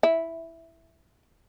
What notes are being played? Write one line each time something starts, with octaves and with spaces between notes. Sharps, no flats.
E4